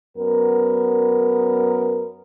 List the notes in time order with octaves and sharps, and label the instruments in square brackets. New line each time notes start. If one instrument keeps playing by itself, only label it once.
[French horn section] F#2 B3 A#4